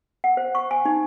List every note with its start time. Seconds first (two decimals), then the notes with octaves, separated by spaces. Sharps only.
0.24 F#5
0.37 C5
0.55 C#6
0.71 G#5
0.85 D#4